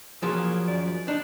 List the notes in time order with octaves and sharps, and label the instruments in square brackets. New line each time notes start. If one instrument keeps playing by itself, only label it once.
[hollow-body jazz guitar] F3 F#3 [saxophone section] A#3 C#4 G#4
[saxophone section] F#2 D#3 D5
[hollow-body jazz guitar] D4 [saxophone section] D#4